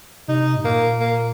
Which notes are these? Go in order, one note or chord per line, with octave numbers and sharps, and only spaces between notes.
C3 D#4
G#2
A#2 A#3
A#3